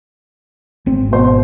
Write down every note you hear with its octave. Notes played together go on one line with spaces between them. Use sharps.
G#1 C4
B2 C5